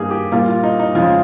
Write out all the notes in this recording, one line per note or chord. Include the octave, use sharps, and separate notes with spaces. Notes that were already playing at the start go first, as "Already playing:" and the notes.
Already playing: G2 D#3 G3 A#3 G#4
G4
A#2 G3 A#3 F4
F4
D#4
D#4
F2 C#3 G#3 F4